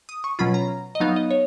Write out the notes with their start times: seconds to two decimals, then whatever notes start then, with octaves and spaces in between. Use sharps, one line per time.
0.09 D#6
0.24 C#6
0.39 B2 F#3 C#4 F4 B5
0.54 A#5
0.95 D#5
1.00 F#3 B3 D#4 F5
1.16 D#5
1.31 C#5